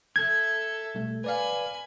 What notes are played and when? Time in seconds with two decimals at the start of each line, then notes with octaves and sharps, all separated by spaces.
0.16 A4 E5 G#6
0.95 B2 G3 A3
1.24 B4 D5 F5 G#5 B5